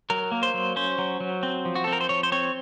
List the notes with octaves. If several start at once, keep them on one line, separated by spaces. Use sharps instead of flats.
F#3 A#4
A#3
C5
F#3
C#4 C5
F#3
F#3
C4
F3
F#4
C4 A4
A#4
C5
F3 C#5
C5
C4 C#5